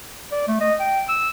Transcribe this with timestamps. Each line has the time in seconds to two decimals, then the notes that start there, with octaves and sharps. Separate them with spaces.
0.32 D5
0.48 A3
0.61 D#5
0.80 G5
1.09 E6